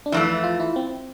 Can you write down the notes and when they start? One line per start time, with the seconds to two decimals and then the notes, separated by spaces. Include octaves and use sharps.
0.06 D4
0.12 F2 E3 A3 E4
0.44 F4
0.60 E4
0.76 C4